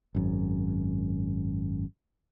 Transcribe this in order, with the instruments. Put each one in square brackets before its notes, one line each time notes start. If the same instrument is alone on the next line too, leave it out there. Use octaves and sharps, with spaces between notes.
[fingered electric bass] G#1 F#2